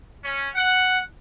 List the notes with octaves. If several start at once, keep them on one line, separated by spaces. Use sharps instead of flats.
C#4
F#5